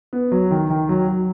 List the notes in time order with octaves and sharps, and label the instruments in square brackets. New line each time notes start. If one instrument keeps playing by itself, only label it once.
[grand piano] B3
F#3
D#3
D#3
F#3
F#3